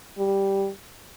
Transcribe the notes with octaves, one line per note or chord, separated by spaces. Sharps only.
G3